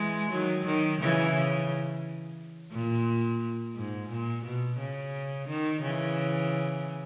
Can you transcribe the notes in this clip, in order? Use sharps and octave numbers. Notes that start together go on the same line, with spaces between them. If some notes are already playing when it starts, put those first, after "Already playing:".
Already playing: E3 G#3
D#3 F#3
D#3
C#3 E3
C#3
A#2
G#2
A#2
B2
C#3
D#3
C#3 E3